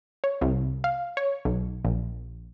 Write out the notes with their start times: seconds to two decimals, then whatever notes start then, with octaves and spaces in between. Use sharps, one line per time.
0.24 C#5
0.41 C2
0.84 F5
1.17 C#5
1.45 B1
1.85 A#1